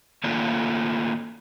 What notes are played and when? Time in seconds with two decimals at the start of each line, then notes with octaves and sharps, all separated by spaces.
0.24 D#3 A3 A#3 D4 F4 A4